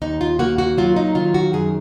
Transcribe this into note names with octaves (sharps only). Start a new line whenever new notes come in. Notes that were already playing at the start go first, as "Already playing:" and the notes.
D#2 D#4
F4
A#3 F#4
F#4
F#3 F4
D#4
D#3 F4
F#4
F#2 G#4